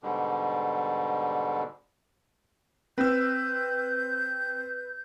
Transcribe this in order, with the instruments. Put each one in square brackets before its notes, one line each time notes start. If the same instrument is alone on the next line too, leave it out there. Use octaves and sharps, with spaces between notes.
[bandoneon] G#2 B2 D3 G3
[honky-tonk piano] C4 [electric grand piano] B4 E6 [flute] G6